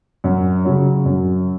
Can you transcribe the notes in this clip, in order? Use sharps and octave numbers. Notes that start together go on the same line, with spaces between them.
F#2
C#3 F#3 C#4
F#2